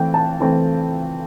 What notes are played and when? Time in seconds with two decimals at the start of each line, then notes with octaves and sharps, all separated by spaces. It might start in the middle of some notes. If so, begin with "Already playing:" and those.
Already playing: E3 A3 C4 G5
0.14 A5
0.40 E3 A3 C4